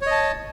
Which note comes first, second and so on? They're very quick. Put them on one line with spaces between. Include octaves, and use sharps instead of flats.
C#5 D#5 A5